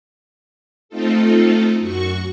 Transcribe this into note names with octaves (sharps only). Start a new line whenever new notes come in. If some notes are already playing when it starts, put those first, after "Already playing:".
A3 C4 D#4 F4 A4
F#2 F#4 C#6